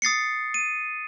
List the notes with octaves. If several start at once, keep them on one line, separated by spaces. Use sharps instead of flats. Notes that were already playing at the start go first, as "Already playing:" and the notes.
D#6 A6 C7 C#7
D#7